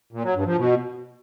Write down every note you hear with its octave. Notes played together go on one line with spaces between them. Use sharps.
A#2
F#3
G2
F3
B2